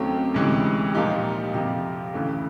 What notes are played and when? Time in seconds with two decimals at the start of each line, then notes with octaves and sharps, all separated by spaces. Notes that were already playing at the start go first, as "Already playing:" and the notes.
Already playing: D#2 C#3 F#3 A3 C4
0.34 D2 C3 E3 G#3 C#4
0.94 A#2 F3 A#3 D#4 G4
1.54 F2 C3 F3
2.14 D2 C#3 E3 A3